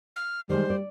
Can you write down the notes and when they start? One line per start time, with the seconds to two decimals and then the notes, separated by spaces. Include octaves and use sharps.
0.16 F6
0.50 D#3 G3 G#3 C5
0.70 D5